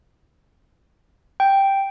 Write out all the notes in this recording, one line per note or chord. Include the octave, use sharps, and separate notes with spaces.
G5